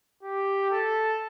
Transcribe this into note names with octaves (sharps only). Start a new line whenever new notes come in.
G4
A4